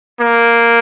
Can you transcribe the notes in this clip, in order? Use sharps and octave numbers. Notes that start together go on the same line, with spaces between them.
A#3